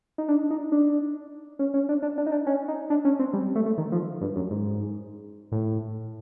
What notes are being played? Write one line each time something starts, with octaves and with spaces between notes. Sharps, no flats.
D#4
D4
D#4
D4
C#4
C#4
D4
D4
D4
D#4
D4
C#4
D#4
D4
C#4
C4
G3
A3
A3
D#3
F3
G2
F#2
G#2
A2